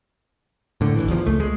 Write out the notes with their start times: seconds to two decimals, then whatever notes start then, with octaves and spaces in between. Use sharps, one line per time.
0.81 A2 D3
0.96 G#1 C#2 E3
1.08 E2 F3
1.25 C#2 A3
1.40 G#3